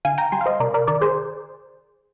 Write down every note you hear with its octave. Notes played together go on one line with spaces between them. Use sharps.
D3 F5 G#5
G5 A#5
G3 G#5 C6
F5
C5 D#5
C3 A#4 D5
A#4 D5
D#3 A#4 D5
G#4 C5